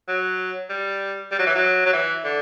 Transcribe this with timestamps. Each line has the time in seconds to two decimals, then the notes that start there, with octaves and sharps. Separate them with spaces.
0.08 F#3
0.70 G3
1.32 G3
1.39 F#3
1.47 E3
1.55 F#3
1.85 F#3
1.93 E3
2.24 D3